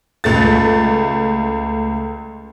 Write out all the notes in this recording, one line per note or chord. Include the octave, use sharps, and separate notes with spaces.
C#2 A3 A6